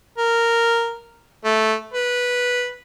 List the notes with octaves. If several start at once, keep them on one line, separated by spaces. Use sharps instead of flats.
A#4
A3
B4